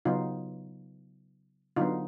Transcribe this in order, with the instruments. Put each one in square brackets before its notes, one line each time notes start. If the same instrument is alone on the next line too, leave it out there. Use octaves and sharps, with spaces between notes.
[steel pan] C#3 F#3 B3 D#4 F4
D3 F#3 B3 D#4 F4